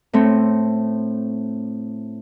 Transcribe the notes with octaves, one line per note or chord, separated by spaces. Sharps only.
A2 A3 C4